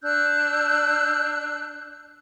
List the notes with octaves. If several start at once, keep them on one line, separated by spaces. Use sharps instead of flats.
D4 E6 F#6 G6